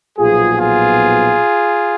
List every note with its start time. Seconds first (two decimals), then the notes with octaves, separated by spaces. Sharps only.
0.18 B1 A#2 F3 B3 F4 G#4
0.56 F4 G#4